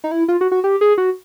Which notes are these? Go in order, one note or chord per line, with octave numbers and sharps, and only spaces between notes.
D#4
E4
F4
F#4
F#4
G4
G#4
F#4